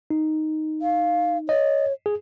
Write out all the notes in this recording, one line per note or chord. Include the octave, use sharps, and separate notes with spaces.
D#4
F5
C#5 D#5
G#4